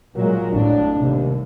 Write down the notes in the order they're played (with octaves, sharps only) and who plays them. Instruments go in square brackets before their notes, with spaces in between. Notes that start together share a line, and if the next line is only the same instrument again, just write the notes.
[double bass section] A#2 F#3 G#3 [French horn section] F4 F#4 A#4
[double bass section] A1 A2 [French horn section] F2 D4
[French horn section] D#2 G3 [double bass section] C3